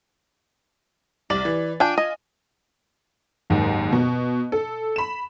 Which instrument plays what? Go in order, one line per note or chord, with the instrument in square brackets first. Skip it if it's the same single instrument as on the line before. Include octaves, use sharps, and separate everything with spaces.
[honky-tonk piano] C2 A6 F#7 [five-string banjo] D5
[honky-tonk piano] E3
[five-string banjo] D4 G5 [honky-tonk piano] F4 G#5
[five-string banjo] D#5
[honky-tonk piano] F#1 D#2 G#2
B2
A4
B5 E7